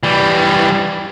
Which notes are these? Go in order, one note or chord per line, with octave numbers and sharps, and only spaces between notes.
E3 G3